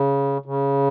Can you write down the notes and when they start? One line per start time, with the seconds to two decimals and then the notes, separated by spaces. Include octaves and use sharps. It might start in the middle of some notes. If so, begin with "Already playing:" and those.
Already playing: C#3
0.45 C#3